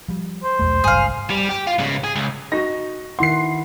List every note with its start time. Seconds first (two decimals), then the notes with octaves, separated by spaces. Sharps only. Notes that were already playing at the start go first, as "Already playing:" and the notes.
0.08 F3 G3
0.43 C5
0.59 B1 E2 A3
0.84 G#1 C#2 G2 G#4 F5
1.30 G3
1.49 G4
1.67 F4
1.79 G#2 C#3
2.04 G#4
2.16 C#2
2.52 D#4 F#4 A#6
3.19 D#3 E4 F#5 C6 C7